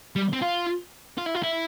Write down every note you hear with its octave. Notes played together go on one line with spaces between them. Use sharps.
G3
C4
F4
F4
E4
F4
E4